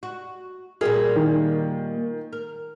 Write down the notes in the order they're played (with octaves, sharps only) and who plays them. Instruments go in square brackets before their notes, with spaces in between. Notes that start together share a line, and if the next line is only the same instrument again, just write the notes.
[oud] F#4
[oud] A#2 G3 A#3 [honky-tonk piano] G#4
[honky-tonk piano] D#3
[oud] A#4